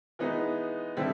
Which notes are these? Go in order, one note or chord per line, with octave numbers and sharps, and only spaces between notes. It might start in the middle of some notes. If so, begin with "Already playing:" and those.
E3 G#3 B3 D#4
D3 G3 C4 E4